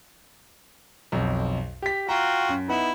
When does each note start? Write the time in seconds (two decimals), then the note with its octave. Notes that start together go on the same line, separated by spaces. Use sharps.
1.12 B1 F2
1.82 G4 B6
2.09 F4 F#4 G5 A#5
2.49 F#2
2.69 B3 D#4 E4 F#5